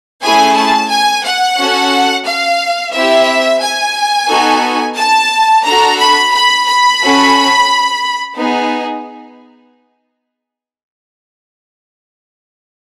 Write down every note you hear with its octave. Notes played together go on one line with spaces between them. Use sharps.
A3 C#4 E4 G#4 G#5
A5
G#5
F#5
C#4 F#4 A4
F5
C4 E4 G4 E5
G#5
B3 D#4 F#4 A4
A5
D4 F#4 A4 A#5
B5
B5
B5
C#4 F#4 A4
B3 D#4 G#4